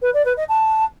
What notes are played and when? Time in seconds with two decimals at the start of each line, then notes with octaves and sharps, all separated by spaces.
0.01 B4
0.13 D5
0.25 B4
0.37 D#5
0.48 A5